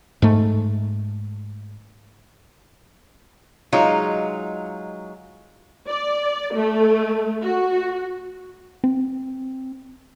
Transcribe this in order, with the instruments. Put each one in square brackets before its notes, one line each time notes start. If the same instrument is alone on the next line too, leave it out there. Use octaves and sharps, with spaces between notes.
[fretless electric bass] G#2 A3
[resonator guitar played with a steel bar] F#3 G#3 D#4 F4
[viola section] D5
A3
F#4
[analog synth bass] C4